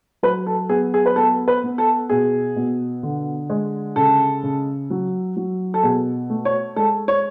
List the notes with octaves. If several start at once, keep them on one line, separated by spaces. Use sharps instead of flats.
F#3 B4
A4
B3 G#4
G#4
B4
B3 A4
B4
B3
A4
B2 G#4
B2
D3
G#3
C#3 A4
C#3
F#3
F#3
A4
B2 G#4
A3
C#5
G#3 A4
C#5